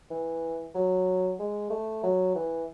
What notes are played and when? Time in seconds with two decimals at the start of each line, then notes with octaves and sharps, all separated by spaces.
0.10 E3
0.75 F#3
1.39 G#3
1.70 A3
2.03 F#3
2.35 E3